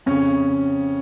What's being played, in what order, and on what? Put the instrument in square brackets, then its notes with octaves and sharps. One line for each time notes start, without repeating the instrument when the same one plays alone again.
[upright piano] F2 C#3 C#4